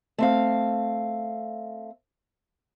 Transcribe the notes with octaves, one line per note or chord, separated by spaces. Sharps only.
A3 C4 F5